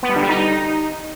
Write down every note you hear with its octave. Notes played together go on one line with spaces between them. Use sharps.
B3
G3
D3
G3
D#4